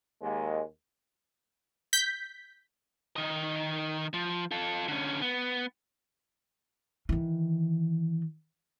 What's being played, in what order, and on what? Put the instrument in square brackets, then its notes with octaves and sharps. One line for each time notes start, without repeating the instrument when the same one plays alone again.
[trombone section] D#2 G#3
[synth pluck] G6 B6
[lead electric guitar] D#3 D#5
F3
F4 A4
D3 C#4
B3
[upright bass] D#3 E3